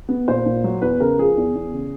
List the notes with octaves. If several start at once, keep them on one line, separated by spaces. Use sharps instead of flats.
B3
A#2 C5
A#2
F#3
E2 B4
C#3 A#4
F3 G#4
E2
E2
C#3